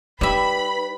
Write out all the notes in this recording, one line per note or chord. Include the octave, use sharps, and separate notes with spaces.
G3 D#4 B4 E5 B5